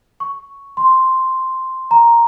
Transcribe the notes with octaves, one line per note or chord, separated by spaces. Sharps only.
C#6
C6
A#5